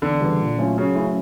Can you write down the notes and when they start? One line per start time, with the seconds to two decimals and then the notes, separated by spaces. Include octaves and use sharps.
0.02 E2 D3
0.20 C#3 E3 G3
0.40 A#2
0.58 F#3 A3 C#4 F4
0.78 C#3 F#3
0.96 A3 C#4 E4